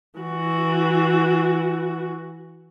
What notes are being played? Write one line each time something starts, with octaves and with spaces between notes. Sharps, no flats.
E3 F#4